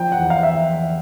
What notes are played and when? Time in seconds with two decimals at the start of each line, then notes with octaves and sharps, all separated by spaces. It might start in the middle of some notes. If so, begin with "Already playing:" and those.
Already playing: F3 G5
0.12 F#5
0.18 E2
0.30 F5
0.43 E5